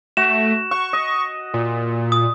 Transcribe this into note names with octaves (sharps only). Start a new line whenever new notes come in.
A3 F#4 E7
F#5 C#6
D#5
A#2
D#6